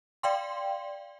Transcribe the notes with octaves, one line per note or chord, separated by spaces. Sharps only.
D5 F5 G5 C6